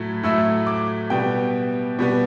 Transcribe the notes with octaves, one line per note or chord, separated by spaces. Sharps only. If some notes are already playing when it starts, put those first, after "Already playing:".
Already playing: A2 F#3 A3 E4
A2 F#3 A3 E4 E6
D6
B2 G3 B3 G5
B2 G3 B3